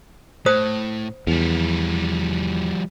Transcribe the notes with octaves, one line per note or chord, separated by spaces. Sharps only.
A2 C5 D#6
E2 F3 G3